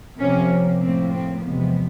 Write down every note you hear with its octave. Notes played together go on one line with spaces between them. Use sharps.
C3 F3 A#3 C#4
A2 F3 A#3 C4
C4
E2 C3 F3 G#3 B3